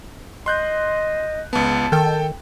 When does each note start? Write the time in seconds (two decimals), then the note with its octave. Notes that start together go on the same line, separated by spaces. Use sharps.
0.46 D#5 C6 F#6 G6
1.53 C#2 B3 A5
1.92 D#3 A4 G5